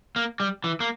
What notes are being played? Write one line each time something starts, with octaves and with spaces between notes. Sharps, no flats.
A#3
G3
E3
A#3